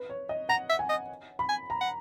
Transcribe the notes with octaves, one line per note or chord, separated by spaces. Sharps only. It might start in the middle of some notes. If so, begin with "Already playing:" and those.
Already playing: B4
C#5
D#5
F#5 A#5
E5
G#5
D#5
B5
G#5
A#5
F#5